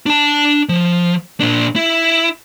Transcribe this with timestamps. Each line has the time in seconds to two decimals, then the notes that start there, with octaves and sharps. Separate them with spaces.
0.06 D4 A5
0.69 F3
1.40 A#2 D4
1.76 E4